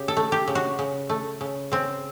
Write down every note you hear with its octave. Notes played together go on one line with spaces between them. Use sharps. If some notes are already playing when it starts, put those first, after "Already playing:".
Already playing: C#3 G4
A4
A3
G4
C#3
F#4
C#3
A3
C#3
C#3 C4